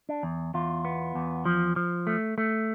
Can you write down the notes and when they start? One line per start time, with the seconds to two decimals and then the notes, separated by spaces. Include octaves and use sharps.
0.09 D4
0.23 E2
0.54 E2 F4
0.85 B3
1.15 E2
1.45 F3
1.76 F3
2.07 A3
2.38 A3